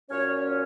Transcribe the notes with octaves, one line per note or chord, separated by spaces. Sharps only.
A#2 F#3 C#4 C#5